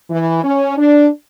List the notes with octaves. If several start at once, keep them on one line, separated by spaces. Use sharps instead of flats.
E3
C#4
D4